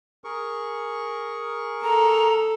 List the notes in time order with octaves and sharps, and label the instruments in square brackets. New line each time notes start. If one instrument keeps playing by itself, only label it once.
[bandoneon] G#4 A#4 C#6
[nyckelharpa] A4 [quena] A#5